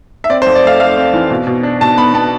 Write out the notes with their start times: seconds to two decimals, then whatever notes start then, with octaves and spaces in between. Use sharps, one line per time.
0.24 E5
0.30 C4 D5
0.42 C5
0.46 F2
0.55 D5
0.63 A3 F5
0.80 A3 F5
0.97 C4
1.13 E3
1.31 B2
1.47 B2
1.63 D4
1.81 B2 A5
1.97 B3 B5
2.14 B3 A5